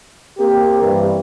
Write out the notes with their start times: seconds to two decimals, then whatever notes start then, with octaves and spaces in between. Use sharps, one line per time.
0.38 A#3 C4 G4
0.81 G2 E3